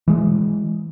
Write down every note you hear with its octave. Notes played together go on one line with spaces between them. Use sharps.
E3 G#3